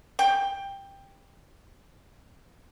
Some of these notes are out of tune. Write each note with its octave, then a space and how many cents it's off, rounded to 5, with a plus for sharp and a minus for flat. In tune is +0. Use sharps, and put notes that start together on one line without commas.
G5 +10